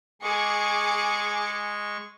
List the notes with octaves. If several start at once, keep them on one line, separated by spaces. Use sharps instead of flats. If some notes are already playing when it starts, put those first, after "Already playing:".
G#3 G#4 C#6 D6 C#7